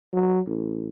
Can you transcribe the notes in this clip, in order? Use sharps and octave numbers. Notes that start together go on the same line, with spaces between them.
F#3
A1